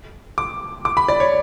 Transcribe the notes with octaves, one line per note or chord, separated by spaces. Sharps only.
D6
D6
B5
D5
C#5